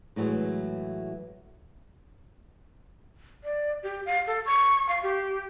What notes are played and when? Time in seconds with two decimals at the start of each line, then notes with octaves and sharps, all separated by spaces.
0.16 A2 E3 F#3 G#3
3.43 D5
3.83 G4
4.06 F5
4.27 A4
4.46 C#6
4.89 F5
5.03 G4